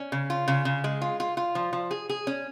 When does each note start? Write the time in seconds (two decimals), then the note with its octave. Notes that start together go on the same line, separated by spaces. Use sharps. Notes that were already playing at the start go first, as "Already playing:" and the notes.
Already playing: C#4
0.12 C#3
0.30 F4
0.48 C#3
0.65 C#3
0.84 G#3
1.02 F4
1.20 F4
1.37 F4
1.55 F3
1.73 F3
1.91 G#4
2.09 G#4
2.27 C#4